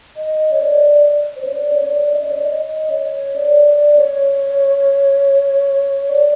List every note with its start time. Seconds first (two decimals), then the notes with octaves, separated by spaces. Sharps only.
0.17 D#5
0.52 C#5
0.62 D5
1.36 C5
1.45 C#5
1.53 D5
1.73 C#5
1.84 D5
2.14 D#5
2.22 D5
2.29 C#5
2.37 D5
2.44 D#5
2.90 C#5
3.36 D5
3.66 D5
3.97 C#5
6.09 D5